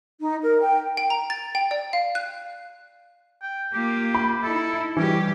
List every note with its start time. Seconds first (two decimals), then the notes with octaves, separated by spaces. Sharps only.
0.20 D#4
0.42 A#4
0.61 G5
0.97 G5
1.10 A#5
1.30 A6
1.55 G5
1.71 D5
1.93 F5
2.15 F#6
3.42 G5
3.73 A#3 F4 G4
4.15 B5
4.43 D#4 E4 A4
4.97 E3 G3 C#4 G4